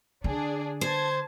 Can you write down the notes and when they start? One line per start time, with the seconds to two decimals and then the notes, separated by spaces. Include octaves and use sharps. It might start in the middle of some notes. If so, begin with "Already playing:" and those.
0.24 D3 D4 G#4
0.81 C5 A5 G#6